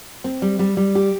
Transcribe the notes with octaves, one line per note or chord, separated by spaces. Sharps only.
C4
G3
G3
G3
G4